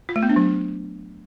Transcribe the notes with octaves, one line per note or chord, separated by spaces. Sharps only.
F4
A3
B3
D4
F#3